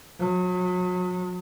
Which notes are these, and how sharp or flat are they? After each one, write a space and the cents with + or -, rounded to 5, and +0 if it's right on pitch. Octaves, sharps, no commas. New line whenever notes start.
F#3 -35